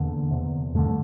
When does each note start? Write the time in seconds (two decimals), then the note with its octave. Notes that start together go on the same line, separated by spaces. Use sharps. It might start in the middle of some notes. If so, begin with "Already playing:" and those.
Already playing: E2 D3 A#3
0.31 E2 C3
0.75 G2 D3 A3